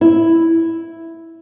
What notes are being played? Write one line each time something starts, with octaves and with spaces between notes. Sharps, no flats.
E4